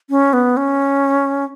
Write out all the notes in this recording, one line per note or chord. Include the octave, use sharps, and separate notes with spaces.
C#4
B3
C#4